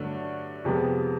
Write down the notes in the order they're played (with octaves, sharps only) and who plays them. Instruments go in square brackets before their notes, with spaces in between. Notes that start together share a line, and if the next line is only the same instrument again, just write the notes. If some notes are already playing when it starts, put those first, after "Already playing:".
Already playing: [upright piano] G2 D3 F#3 A3 D4
F2 C3 F3 G#3 B3